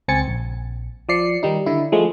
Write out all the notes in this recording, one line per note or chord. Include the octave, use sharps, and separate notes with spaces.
C#2 C4 G#5 A6 C#7
A#1
F3 D5 C7 C#7
D#3 G3 D#4
D3 E4
F3 G#3 A3